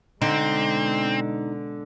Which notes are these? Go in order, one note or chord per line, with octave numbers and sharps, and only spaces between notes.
B2 D3 G#3 C4 D#4